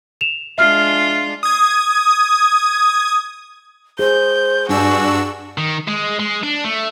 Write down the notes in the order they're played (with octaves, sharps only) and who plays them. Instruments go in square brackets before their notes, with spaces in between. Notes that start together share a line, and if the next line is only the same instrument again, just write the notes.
[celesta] E7 F7
[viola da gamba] G#3 D4 F4 [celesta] E5 F6 C7
[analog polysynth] D#6 G#6
[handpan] G#4 [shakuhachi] C5 [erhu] G6
[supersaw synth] G2 D4 E6 [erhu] F#4 [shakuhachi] G#5
[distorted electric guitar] D#3
G#3
G#3
D4
A3